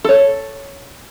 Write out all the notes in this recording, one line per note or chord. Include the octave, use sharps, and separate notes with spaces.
A4 C#5